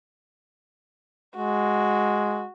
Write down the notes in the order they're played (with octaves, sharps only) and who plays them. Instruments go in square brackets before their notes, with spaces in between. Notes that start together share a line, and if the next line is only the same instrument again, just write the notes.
[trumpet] G#3 [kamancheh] F#4